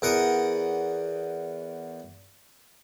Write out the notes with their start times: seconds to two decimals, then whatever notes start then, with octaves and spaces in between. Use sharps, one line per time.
0.02 E2 A#4 F#5 A#5 D#6